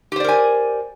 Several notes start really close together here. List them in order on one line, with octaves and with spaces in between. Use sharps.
G4 C5 D5 A#4 G#5